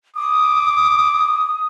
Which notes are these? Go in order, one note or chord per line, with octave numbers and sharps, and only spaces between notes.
D6 D#6